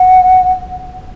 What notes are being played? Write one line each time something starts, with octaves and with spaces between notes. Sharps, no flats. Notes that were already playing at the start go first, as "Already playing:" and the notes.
Already playing: F#5